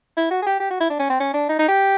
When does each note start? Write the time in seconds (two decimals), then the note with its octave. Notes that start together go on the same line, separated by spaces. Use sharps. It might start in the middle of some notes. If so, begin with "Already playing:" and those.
0.17 E4
0.31 F#4
0.42 G#4
0.46 G4
0.60 G4
0.70 F#4
0.80 E4
0.90 D4
0.99 C#4
1.10 C4
1.20 C#4
1.34 D4
1.49 D#4
1.59 D#4
1.68 G4